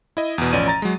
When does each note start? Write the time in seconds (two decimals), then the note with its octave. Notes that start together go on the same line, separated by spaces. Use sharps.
0.17 E4 D#5
0.38 E2 B2
0.53 A1 F3 C#4 D5 D#7
0.68 A#5 A6
0.82 F#3 G#3